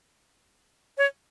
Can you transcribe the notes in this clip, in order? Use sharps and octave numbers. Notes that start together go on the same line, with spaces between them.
C#5